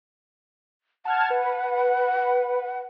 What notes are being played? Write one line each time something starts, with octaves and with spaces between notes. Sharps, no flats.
F#5 A5 F6 G#6
B4